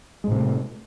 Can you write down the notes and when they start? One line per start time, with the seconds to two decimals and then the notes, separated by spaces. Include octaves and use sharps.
0.24 G#3
0.28 A2
0.32 C3
0.35 A3